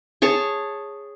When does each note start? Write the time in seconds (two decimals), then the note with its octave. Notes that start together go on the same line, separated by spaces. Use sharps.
0.22 G#4 C#5 A5